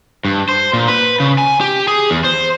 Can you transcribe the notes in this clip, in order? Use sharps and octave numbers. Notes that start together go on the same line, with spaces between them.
G2
C5
A#2
B4
C#3
G#5
G4
G#4
E2
C5